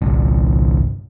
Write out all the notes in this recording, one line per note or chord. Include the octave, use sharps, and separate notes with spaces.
G1 C2